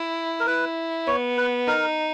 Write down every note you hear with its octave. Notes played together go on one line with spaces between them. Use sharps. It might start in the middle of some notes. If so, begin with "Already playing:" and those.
Already playing: E4
A#4
E4 B4
B3 C#5
B4
D#4 A#4